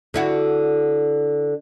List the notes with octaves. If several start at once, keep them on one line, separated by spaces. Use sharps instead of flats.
D3 E4 F#4